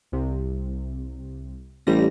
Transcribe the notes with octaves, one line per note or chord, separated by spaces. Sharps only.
C2 C3
A1 G3 A#6